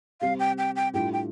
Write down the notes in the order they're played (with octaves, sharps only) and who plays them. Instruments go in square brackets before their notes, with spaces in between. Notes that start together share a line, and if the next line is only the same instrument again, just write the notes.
[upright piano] C3 G3 C4 [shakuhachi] F5
[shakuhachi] G5
G5
G5
[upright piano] A2 G3 D4 F4 [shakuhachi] G5
[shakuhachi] G5